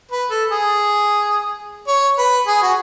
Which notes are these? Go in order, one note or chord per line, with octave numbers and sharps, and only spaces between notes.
B4
A4
G#4
C#5
B4
G#4
F#4